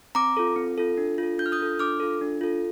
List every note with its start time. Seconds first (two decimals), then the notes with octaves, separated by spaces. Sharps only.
0.15 C4 A#5 D6
0.37 F4 A4
0.56 C4
0.78 F4 A4
0.98 D4
1.18 F4 A4
1.38 D4 G6
1.46 F6
1.52 D#6 G6
1.60 F4 A4
1.79 D4 D6 F6
2.00 F4 A4
2.21 D4
2.41 F4 A4